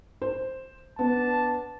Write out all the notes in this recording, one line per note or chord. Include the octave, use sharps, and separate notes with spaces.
C5
B3 D4 A5